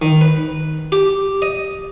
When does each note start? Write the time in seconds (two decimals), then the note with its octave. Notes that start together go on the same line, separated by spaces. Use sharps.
0.02 D#3
0.21 B4
0.92 G4
1.42 D#5